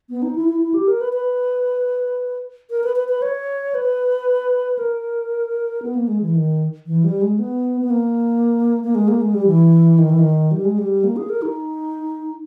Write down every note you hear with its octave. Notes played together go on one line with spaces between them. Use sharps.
B3
D#4
E4
E4
E4
G4
A#4
B4
B4
A#4
B4
B4
B4
C#5
B4
A#4
B3
A#3
G#3
E3
D#3
E3
G3
G#3
B3
B3
A#3
A#3
G#3
A#3
G#3
G3
E3
D#3
E3
D#3
G3
G#3
G3
A#3
G#4
A#4
D#4